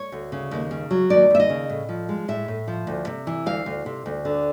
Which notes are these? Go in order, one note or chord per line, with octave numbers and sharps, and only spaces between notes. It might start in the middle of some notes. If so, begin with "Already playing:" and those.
Already playing: C#5
D2
C#3
D#2
C#3
F#3
D#2 D5
D#2 E5
D#5
C#3
A2
F3
G#3
A2 E5
A2
F3
D2
C3
E3
D2 F5
D2
C3
D2
D3